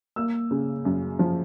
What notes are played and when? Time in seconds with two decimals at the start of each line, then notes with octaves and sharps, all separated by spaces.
0.16 A#3 E6
0.51 C#3
0.85 F#2
1.19 F3